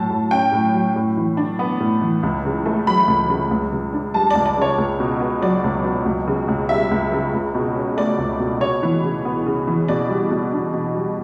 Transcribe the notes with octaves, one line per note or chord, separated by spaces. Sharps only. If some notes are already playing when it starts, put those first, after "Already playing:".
Already playing: A2 F#3 A5
A2
C#4 G5
A2
F#3
A2
E3
D4
B3
A2
E3
C#2
C#3
A3
F#3 B5
C#2
C#3
C#2
C#3
D4
G3 A5
D5
C#2
D5
C#3 C#5
C#2
B2
B3
F#3 D5
C#2
B2
C#2
C#3
C#2
G3 E5
C#2
C#3
C#2
B2
C#4
A3 D5
C#2
B2
C#3 C#5
E3
C#3
B3
C#3
E3
B2 D5
G3
B2
D4
B2
G3